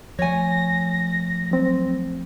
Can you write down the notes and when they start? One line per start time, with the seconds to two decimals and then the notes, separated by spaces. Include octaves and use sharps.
0.19 F3 A3 C#5 G#5 A#6
1.51 F#3 C4